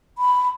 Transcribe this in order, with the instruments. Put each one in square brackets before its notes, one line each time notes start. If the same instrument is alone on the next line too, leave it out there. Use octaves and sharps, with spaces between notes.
[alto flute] B5